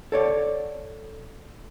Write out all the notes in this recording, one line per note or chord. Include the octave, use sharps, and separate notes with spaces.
A4 C#5 D5